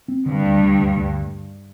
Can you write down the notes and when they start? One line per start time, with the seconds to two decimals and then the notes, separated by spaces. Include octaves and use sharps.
0.08 C4
0.26 G2 D3
0.43 D2
0.61 D2
0.79 D2
0.96 D2